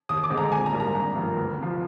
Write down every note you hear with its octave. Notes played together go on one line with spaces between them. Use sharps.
D#2 D#6
D6
D3 G#3 C4
A#5
A#1 G#5
A#5
G#2 G3 A#3 D4
A#5
G#1 A#5
G2 F3 A#3
D2
C3 F3